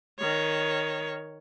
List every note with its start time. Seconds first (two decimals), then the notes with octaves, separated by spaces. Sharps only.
0.19 D#3 C#5